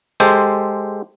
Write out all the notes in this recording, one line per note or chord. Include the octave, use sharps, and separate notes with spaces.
G#3 G4 A4 C5